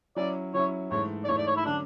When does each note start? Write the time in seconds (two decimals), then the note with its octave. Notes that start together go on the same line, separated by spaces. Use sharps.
0.16 F#3 C#4 E4 D5
0.54 F#3 C#4 E4 C#5
0.91 G#2 E3 A3 C#5
1.24 D5
1.29 G#2 E3 A3 C#5
1.38 D5
1.47 C#5
1.56 E4
1.65 D3 F#3 C#4 D4